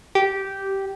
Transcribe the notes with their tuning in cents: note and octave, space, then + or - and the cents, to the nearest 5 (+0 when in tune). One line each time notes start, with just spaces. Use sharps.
G4 -10